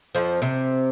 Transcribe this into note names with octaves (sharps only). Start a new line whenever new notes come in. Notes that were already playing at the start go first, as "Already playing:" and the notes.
F2 F3
C3